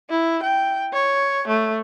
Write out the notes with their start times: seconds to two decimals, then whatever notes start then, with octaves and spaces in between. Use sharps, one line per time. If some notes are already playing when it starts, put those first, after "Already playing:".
0.10 E4
0.43 G5
0.93 C#5
1.48 A3